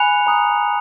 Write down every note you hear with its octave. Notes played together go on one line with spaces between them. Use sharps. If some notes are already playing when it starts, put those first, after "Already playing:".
Already playing: G#5 B5 F#6 C#7 F7
A#5 D#6 F#6